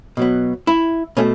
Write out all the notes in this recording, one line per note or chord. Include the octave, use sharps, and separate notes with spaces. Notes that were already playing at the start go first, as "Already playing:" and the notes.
B2 F#3 B3
E4
B2 A3 C#4